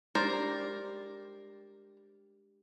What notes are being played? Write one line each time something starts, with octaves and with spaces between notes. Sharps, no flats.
G#3 D4 G4 A#4 C5 D5